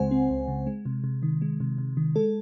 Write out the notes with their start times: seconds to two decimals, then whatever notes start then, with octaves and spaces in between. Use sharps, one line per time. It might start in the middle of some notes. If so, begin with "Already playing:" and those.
Already playing: C#2 C#3 G#3 C4 C5 F#5 G#5
0.11 C4
0.30 C#2
0.48 C#3
0.67 G#3
0.85 C3
1.04 C3
1.23 D#3
1.42 G#3
1.60 C3
1.78 C3
1.97 D#3
2.16 G#3 A4